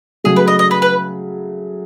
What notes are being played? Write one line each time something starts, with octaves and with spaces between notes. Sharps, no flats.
C#3 F#3 A3 G#4
B4
D#5
D#5
B4
B4